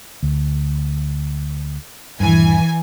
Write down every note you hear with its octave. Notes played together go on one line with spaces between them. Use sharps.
D2
D#1 G2 E3 G#5